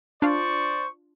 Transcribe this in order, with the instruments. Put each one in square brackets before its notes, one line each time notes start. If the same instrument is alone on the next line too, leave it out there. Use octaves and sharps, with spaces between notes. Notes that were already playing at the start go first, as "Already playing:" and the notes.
[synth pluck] D4 F4 [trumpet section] C5 D5 C#6